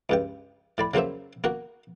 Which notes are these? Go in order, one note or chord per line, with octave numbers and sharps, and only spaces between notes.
C#2 G2 G5
A2 D5 B5
C#3 F#3 A#3 C5 E5
A#3 F#4